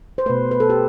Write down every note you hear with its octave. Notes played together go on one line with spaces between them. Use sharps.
C5
B2 A3 B4
B4
A4
G4